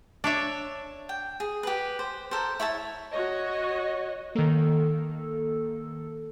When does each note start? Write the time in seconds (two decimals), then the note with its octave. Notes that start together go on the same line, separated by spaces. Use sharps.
0.24 D4 C#5 E5
1.09 G5
1.40 G#4
1.63 G4 B4
1.99 C5
2.31 A4 A#4 C5
2.60 E4 C#5 E5 A5
3.11 F#4 C#5 D#5
4.35 D#3 A#3 A4